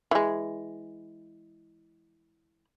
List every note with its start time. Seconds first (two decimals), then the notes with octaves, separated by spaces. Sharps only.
0.11 E3 G#3